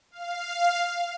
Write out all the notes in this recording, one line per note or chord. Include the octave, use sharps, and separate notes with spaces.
F5